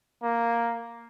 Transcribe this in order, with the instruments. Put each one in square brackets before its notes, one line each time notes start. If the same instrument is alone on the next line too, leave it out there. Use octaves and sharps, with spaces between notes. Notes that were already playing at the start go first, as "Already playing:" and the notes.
[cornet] A#3